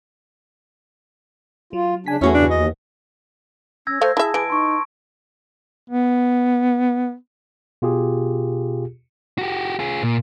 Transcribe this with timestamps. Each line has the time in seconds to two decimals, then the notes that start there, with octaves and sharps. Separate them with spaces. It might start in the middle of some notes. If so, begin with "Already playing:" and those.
1.73 F#3 F4
2.06 C#3 D4 G#5 B6
2.21 E2 A3 B3 C#4 E4 F#4 G#4
2.34 G2 C#3 D4
2.50 D#2 D#5
3.87 C#4 E6 G#6 A#6
4.01 A3 C5 F5
4.17 E4 G#4 E5 A5
4.34 E3 D7
4.50 D#4 C6 C#6
5.90 B3
7.82 B2 F4 G4 G#4
9.38 F#4 G4
9.79 F4 G#4
10.03 A#2